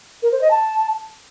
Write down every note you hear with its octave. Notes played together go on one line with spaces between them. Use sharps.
A#4
C5
D#5
A5